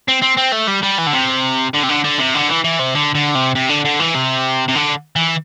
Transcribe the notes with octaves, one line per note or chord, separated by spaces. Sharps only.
C4
C4
C4
A3
G3
G3
E3
D3
C3
D3
C3
D3
D3
C3
D3
E3
E3
C3
D3
D3
C3
C3
D3
D3
E3
C3
C3
D3
E3